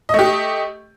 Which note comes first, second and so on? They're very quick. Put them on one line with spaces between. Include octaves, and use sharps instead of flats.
D#5 A3 G4